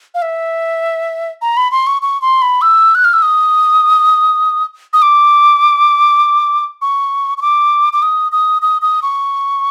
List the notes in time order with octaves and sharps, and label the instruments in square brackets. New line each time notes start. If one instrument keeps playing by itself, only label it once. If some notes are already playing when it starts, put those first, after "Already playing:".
[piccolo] F5
E5
A#5
B5
C6
C#6
C#6
C6
B5
E6
F#6
F6
E6
D#6
D#6
D6
C#6
C#6
D6
D6
D#6
D#6
D#6
D#6
C#6